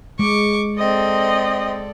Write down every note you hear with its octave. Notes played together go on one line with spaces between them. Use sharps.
G#3 C#6 D6
C4 A4 D5 D#5